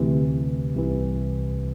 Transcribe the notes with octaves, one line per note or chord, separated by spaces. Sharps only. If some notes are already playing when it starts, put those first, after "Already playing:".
Already playing: D2 C3 E3
C2 C3 E3